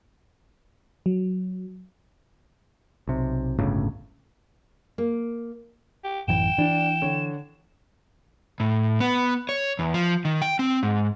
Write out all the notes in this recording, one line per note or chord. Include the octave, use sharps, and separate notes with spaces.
F#3
B1 C3
G1 C#2 A2 C#3
A#3
G4
A1 F#2 E3 G5 E7
E3 D4
D3 C#5
A2
B3
C#5
E2
F3
D#3
G5
C4
G#2